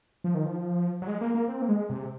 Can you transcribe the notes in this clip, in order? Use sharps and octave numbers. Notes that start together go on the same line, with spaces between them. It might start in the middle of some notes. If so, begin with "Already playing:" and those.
F3
D#3
F3
F#3
G#3
A#3
A#3
C4
A#3
G#3
C3